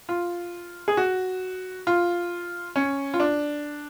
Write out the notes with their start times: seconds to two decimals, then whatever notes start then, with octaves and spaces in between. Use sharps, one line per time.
0.09 F4
0.88 G#4
0.97 F#4
1.87 F4
2.76 C#4
3.14 F4
3.20 D4